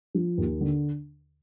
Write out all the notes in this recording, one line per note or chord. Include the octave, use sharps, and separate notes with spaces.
F3
D#2
D3